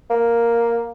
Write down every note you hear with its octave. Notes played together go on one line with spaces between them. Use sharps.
A#3